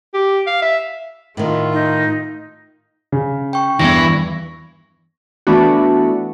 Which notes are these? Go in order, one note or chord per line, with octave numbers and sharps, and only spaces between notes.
G4
F5
E5
A2 D#3 A3 F4
D#4
C#3
G5 C#6
E2 G2 E3 B3 E4 C#6 A#6
E3 A3 B3 D4 F#4